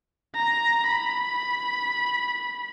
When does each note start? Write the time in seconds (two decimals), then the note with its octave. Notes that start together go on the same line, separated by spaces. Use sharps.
0.35 A#5
0.87 B5